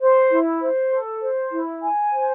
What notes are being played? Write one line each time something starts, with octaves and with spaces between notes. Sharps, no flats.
C5
E4
C5
A4
C5
E4
G#5
C5